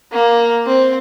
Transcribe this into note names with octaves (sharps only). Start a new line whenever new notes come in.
A#3
C4